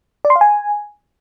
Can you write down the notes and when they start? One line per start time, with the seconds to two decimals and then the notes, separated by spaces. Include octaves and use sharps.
0.25 D5
0.30 C6
0.36 F5
0.41 G#5